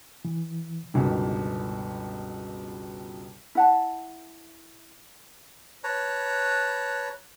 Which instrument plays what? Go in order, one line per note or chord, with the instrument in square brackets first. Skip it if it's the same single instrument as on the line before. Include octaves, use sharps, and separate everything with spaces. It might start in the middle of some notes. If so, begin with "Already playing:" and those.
[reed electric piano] E3
[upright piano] G1 C#2 B2 D#3
[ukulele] E4 F#5 A5
[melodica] B4 C#5 A5 A#5